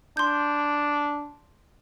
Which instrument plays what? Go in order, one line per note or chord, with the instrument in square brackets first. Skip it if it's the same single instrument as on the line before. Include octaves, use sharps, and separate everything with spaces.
[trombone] D4 [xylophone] C6 G6